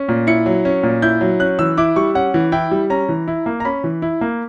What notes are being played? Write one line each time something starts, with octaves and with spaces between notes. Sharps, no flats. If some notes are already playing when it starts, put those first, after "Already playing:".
Already playing: C#4
A#2
E4 C#7
F#3
C#4
A#2
E4 G6
F#3
C#4 F#6
E3 E6
E4 D6
G3 C#6
C#4 F#5
E3
E4 G5
G3
C#4 A#5
E3
E4
A#3
A#5
C#4 B5
E3
E4
A#3